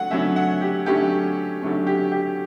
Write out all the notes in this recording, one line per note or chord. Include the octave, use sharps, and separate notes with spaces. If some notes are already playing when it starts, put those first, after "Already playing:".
Already playing: D3 F#3 A3 F#5
D3 F#3 A3 C#4 E5
F#5
G4
D3 F#3 A3 C#4 G4
D3 F#3 A3 C#4
G4
G4